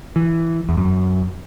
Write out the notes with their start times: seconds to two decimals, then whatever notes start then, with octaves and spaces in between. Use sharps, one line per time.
0.16 E3
0.69 E2
0.77 F#2